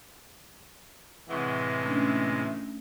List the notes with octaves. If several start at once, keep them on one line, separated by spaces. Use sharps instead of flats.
A2 C3 E3 G#3 F#5 C#6
A3 C#4 D4